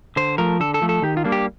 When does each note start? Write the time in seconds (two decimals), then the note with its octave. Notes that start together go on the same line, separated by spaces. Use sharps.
0.16 D3 C5
0.38 F3 A3 A#4
0.60 D3 A4
0.74 A4
0.82 F3 A3
0.89 A4
1.02 D#3 G4
1.17 F4
1.24 G3 A#3 D4
1.32 G4